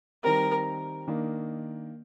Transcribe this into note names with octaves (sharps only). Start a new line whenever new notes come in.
D#3 G3 C4 G4 A#4
D#3 A#3 D4